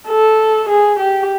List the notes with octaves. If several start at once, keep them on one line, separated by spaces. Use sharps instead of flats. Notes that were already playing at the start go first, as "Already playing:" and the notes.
A4
G#4
G4